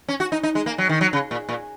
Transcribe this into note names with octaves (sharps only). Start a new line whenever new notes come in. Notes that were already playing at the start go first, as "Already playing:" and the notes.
C#4
F#4
D#4
D#4
G#3
A#3
F#3
D#3
F#3
C#3
A#2
A#2